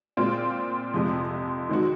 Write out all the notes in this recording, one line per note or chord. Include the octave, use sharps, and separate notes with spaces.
A#2 G#3 C4 F4
F2 C3 F3 G#3
D#3 G#3 C4 D#4 F#4